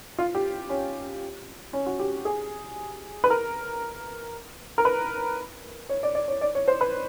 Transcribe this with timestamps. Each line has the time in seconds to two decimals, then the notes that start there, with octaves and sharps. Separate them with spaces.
0.18 F4
0.35 G4
0.69 C#4
1.73 C#4
1.86 F#4
1.99 G4
2.25 G#4
3.24 B4
3.30 A#4
4.78 A#4
4.85 B4
5.89 C#5
6.03 D5
6.15 D5
6.28 C#5
6.41 D5
6.55 C#5
6.68 C5
6.81 B4